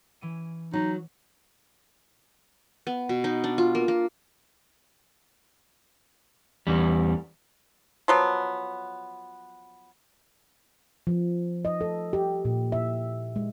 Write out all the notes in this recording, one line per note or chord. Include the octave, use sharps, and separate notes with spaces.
E3 C#4 D#7
F#3 D#4
B3
B2
D#4
D4
F4
A#3
A#3
E2 G3
F3 F#3 B3
F3
D#5
A4
G4
A#2
E5
G#3